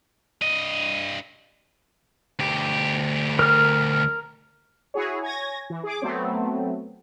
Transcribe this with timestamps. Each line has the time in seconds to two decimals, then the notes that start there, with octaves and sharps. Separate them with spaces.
0.42 G2 D#5
2.39 D2 G4
3.39 A#4 F6
4.94 E4 F#4 G#4 C#5
5.21 C#5 G#5 G#6 A#6
5.70 E3
5.83 G#4 D6
6.02 F#3 A3 B3 C4